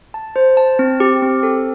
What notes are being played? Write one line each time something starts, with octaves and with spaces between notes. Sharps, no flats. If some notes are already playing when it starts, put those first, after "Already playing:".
A5
C5
A5
C4
G4
C4
A4